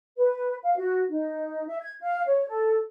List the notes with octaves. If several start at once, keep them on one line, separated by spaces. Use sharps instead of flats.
B4
F5
F#4
D#4
E5
G#6
F5
C#5
A4